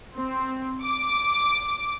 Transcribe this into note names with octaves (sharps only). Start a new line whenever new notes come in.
C4
D6